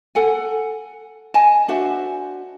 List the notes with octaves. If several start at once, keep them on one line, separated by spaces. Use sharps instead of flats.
A4 F#5 G#5
D#5 G#5 A5
D4 F#4 C5 E5